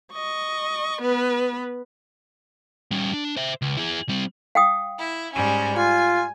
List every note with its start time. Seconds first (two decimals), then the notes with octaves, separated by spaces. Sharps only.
0.13 D#5 C#6
1.01 B3 B4
2.91 G3 C#4
3.14 D4
3.36 C5 E5
3.62 C#2
3.77 E4 G#4
4.09 G3 C4
4.55 F5 G5 D#6
4.99 E4
5.34 G#2 G3 C#4
5.76 F4 G#5